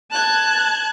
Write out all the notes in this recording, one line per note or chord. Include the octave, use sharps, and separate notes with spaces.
A5 F#6 G#6